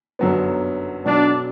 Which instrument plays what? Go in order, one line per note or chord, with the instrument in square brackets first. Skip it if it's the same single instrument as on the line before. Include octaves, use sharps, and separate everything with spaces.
[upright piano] G1 F#2 D3 F#3 B3
[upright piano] B1 B2 F#3 [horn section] D4